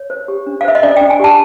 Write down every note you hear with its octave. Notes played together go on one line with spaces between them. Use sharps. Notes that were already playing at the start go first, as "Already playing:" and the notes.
Already playing: C#5
C5
G4
D4
F5
C5 E5
D#5
D4 D5
D4 G5
G#5
G4 A5